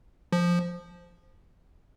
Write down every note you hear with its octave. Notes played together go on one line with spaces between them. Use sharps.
F3